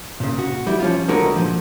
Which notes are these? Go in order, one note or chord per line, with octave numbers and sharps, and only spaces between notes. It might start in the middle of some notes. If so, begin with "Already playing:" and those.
A#2 C#3
F#4
G3 E4
F3 C#4 F4
C#2 D3 G#3 F#4 A#4 B4
A#2 F3